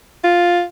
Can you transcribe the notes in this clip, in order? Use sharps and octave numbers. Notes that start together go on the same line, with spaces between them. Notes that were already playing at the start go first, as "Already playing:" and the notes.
F4